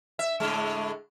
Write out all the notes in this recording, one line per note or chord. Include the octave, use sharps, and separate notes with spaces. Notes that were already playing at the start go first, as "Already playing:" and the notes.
E5
A2 D3 G#3